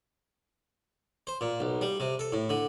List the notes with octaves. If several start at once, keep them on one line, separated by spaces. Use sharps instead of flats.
C5
A#2
B1
G3
C3
A4
A2
D3